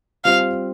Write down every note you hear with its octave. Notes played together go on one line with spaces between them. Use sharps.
G3 C4 F4 C5 F5